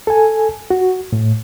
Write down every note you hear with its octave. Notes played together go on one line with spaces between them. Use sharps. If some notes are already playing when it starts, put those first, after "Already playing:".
A4 G#5
F#4
A2